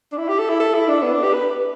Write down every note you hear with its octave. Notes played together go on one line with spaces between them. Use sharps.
D4
E4
G4
A4
E4
A4
E4
D4
B3
D4
G4
B4